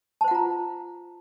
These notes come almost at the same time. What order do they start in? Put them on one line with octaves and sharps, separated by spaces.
A5 C5 F#5 F4 A#5